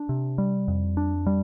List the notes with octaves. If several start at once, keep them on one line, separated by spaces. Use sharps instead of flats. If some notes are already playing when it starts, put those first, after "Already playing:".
Already playing: D4
C3
G3
F2
D4
G3